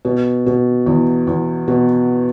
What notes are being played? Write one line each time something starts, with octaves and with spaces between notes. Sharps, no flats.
B2
B2
E2
E2
B2